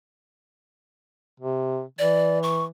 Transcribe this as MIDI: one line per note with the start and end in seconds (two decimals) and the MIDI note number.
1.40 1.83 48
1.99 2.67 52
1.99 2.39 74
2.43 2.64 85